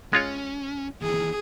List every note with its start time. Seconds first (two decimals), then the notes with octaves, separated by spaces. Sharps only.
0.13 G#3 C#4 F4 C#5
1.01 D#2 E3 G#4